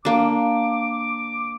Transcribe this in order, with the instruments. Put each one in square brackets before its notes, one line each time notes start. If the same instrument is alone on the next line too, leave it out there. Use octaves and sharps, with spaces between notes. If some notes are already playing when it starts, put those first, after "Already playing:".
[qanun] A#3 D4 [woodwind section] D6